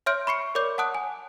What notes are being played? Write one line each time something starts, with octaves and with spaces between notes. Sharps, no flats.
C#5 E5 C6 F6 G6 D7
B5 C#6 C7 C#7
A#4 C#5 D5 D6 G6
F#5 A5 D#6 F#6 D7
G#5